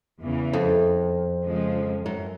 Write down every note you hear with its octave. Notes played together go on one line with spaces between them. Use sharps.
E2 C#3 E3
F2
C#3 F3 G#3
F#2